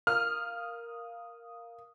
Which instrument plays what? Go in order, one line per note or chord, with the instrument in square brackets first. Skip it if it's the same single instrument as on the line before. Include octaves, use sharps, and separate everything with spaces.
[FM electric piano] A#4 F5 D#6 [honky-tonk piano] F6